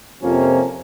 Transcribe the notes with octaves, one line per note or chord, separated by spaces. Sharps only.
F2 C3 F3 A#3 C#4